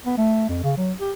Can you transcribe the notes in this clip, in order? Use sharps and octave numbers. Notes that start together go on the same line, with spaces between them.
B3
A3
F2
C#3
F#3
G4